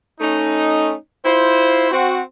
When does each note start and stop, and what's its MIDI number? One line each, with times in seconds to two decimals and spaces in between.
0.21 0.94 57
0.21 0.94 61
0.21 0.94 63
1.25 1.89 64
1.25 1.89 65
1.25 1.89 72
1.92 2.20 60
1.92 2.20 66